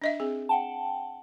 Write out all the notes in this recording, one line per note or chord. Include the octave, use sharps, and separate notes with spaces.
D4 D#5 E5
C4 G#4
F#5 G5 A5